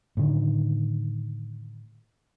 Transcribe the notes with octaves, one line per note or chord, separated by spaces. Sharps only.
A2 D3 D#3